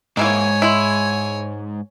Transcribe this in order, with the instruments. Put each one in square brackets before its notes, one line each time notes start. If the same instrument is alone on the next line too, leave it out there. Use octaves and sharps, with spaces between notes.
[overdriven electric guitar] G#2 [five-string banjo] D#3 E3 A#3 [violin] C#5 G#5
[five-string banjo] G#3 E4